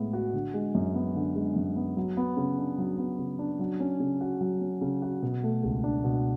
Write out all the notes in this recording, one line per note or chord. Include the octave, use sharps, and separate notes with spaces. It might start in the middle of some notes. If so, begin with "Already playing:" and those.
Already playing: A2 G#3 B3
F#4
D3
G#3
F#2
B3
D3
G#3
F#2
B3
F#3
B3
C#3
D4
F#3
B3
C#3
D4
F#3
C#4
C#3
F#4
F#3
C#4
C#3
F#4
B2
A3
C#2
D4
B2